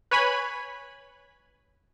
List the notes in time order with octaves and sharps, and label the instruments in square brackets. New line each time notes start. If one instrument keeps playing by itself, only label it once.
[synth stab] B4 C#5 G#5 B5